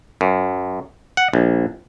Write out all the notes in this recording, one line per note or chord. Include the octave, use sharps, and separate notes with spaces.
F#2
F#5
A#1